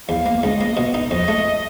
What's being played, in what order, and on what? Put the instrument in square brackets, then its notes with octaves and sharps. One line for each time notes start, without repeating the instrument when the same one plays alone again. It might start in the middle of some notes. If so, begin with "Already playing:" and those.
[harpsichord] E2 [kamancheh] F5
[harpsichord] A#3
[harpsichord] C#2 [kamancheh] D#5
[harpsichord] A#3
B2
D#4
[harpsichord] F2 [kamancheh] D#5
[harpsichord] A3